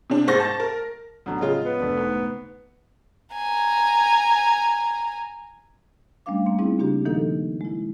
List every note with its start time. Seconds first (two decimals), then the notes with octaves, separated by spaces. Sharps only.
0.10 C3 D4
0.27 G#2 C5 C#6 A6 A#6
0.40 A5
0.60 A#4
1.26 A1 B2 D3 F3 F#3
1.41 C#3 G#3 F4
1.65 B3
1.80 F1 D2 A3 D4
1.97 G#2
3.34 G#5 A#5
6.26 G3 A3 C#4 D4 F5 D6
6.46 A#3 C6
6.59 G3 C4 C#4 D#4 E4 G#4
6.78 C#3 A#3 D4 F#4 G4
7.05 A#2 D#3 F3 A#3 D#4 A4
7.61 G#3 E4